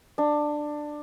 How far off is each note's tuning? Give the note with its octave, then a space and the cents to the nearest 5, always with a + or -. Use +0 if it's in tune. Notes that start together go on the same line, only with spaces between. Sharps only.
D4 +15